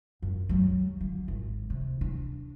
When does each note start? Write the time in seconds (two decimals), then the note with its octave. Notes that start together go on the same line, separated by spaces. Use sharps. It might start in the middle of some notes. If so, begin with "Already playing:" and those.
0.22 F#2
0.49 F#3 G3
1.01 D3
1.28 G#1
1.70 C3
2.01 D4